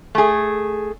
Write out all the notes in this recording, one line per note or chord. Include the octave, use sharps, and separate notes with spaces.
A3 G#4